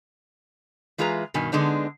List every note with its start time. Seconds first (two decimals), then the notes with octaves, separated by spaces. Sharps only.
0.98 E3 G#3 F4 G#4 B4 A#5
1.34 G2 B2 D#3 G#5
1.52 D3 G#3 B3 D4 D#4